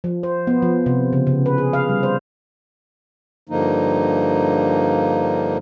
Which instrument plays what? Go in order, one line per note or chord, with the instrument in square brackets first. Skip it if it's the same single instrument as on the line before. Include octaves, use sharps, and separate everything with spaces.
[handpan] F3
C5
B3
F3
C3
C#3
C#3
B4
G#4
F5
G3
C5
[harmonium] G2 D3 F3 A#3 D#4